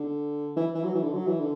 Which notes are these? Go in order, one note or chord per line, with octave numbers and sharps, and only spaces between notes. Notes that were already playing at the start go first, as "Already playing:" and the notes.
Already playing: D3
E3
E3
F#3
E3
D3
F#3
E3
D3